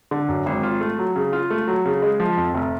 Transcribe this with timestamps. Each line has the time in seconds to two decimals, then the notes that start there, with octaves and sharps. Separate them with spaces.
0.11 D3
0.28 F#2
0.46 G#1
0.63 F4
0.81 A3
0.99 F#3
1.16 C#3
1.33 F4
1.50 A3
1.68 F#3
1.85 C#3
2.02 G#3
2.20 F3
2.37 F2
2.54 F1